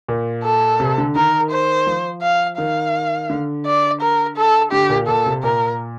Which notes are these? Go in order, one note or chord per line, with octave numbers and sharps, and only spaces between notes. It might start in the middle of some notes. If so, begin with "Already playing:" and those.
A#2
A4
C3
D3
D#3 A#4
C5
F3
F5
D#3 F5
D3
D5
A#4
A4
D3 G4
A#2
A#2 A4
C3
A#2 A#4